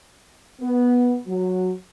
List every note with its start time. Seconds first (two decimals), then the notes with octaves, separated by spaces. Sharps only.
0.60 B3
1.27 F#3